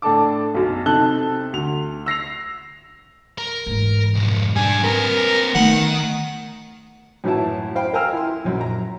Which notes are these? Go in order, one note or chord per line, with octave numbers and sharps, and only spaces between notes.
A2 D4 A4 A5 D6
B1 F#2 B2
C3 D#4 A4 A5 F#6 G7
D2 F7
E6 A#6 C7 F7
A#4
G#2 E3
B1 F2
G3 D4 G#5
C4 A#4 B4
D#3 A3 B3 F#5
F#2 A2 E3 F#3 E4 A5
C5 F5 G5 B5
A#4 G5 G#5 A#5 E6 F6
E4 C6
A#1 F#2
A#5